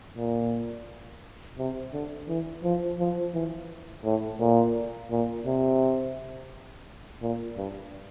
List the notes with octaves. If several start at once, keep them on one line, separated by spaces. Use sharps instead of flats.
A#2
C3
D3
E3
F3
F3
E3
A2
A#2
A#2
C3
A#2
G2